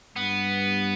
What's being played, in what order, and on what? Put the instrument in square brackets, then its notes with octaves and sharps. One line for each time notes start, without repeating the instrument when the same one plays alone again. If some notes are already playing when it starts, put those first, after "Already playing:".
[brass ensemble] G2 [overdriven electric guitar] B3